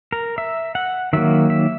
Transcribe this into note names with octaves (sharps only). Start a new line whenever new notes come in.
A#4
E5
F#5
D#3 F#3 A#3 E5
E5